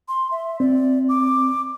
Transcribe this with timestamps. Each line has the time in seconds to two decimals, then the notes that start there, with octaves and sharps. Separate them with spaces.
0.08 C6
0.31 E5
0.60 C4 D5
1.09 D6